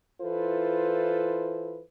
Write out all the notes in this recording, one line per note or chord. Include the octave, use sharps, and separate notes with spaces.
E3 E4 F4 A4 B4 C5